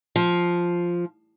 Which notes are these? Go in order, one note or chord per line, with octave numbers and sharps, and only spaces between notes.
F3